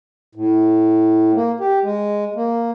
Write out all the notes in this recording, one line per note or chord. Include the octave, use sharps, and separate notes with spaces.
A2
A#3
G4
G#3
A#3